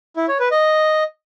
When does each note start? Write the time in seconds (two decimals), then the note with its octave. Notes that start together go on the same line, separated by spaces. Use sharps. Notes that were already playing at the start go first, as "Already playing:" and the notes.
0.17 E4
0.28 C#5
0.40 B4
0.51 D#5